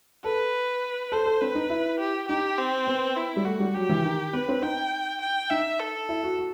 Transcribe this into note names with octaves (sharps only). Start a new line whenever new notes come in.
A4 B4
A4 C5
A4
C4 B4
D#4
E4
G4
D#4 G4
C4
B3
E4
G3
A3 F#4
G3
F#3 G4
E3
D#3
B3 B4
C4
D#4 G5
G5
D#4 E5
A4
E4
F#4
F#4